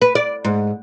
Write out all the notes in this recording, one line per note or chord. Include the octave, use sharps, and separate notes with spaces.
B4
D5
G#2